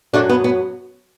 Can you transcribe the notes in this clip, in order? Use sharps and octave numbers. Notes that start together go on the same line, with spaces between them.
F#2 F#3 A3 D4
B3
B3